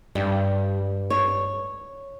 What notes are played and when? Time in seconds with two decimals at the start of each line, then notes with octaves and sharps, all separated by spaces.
0.15 G2 G3
1.10 C#5